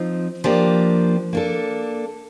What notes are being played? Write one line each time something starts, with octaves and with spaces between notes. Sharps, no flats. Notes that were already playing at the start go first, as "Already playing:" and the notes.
Already playing: F3 C4 D#4
F3 A#3 D4 G4
A#3 D4 A4